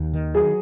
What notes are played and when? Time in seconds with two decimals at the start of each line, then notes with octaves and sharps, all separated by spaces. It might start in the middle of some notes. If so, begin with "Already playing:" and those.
Already playing: D#2
0.14 D#3
0.34 F#3 G#4